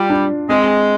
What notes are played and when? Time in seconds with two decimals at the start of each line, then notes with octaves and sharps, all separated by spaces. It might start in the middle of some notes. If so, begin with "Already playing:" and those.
Already playing: G3 F4
0.10 D4
0.49 G#3 C4